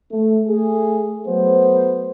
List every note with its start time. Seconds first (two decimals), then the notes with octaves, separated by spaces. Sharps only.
0.11 A3
0.48 A3 G#4
1.27 F#3 A3 B3 C5